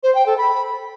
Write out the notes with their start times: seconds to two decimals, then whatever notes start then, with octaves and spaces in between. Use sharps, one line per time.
0.03 C5
0.15 G5
0.26 A4
0.38 B5